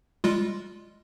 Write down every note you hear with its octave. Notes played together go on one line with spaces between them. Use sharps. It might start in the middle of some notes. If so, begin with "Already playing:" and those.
G3 G#3 F4